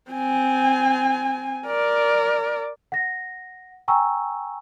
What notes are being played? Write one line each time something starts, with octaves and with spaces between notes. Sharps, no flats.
C4 G#5
A#4 D5
F#5 A#6
G5 G#5 A#5 C#6 E6